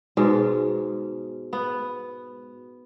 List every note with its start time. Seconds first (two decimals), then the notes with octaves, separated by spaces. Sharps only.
0.17 G#2 B2 G#3
1.53 B3